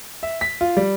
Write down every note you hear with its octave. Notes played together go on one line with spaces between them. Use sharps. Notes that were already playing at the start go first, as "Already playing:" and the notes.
E5
B6
F4
G3